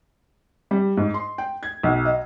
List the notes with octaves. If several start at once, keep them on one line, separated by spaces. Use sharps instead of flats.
G3
G#2
C6
G5
G#6
B1
D#5